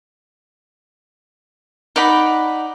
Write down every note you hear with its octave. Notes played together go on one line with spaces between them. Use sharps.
D#4 D5 F#5 B5